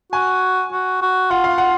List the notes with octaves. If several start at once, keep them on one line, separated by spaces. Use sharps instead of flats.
F#4 G#5
F#4
F#4
F4 F#5
F5
F#5